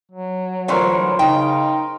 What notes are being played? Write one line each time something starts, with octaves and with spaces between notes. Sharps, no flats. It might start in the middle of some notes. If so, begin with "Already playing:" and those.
F#3
G2 D3 E3 A3 F4 A#4 C5 C#6
C#3 D#4 G5